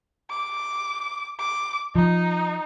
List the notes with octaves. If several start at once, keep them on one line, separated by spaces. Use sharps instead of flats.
D6
D6
F3 D#4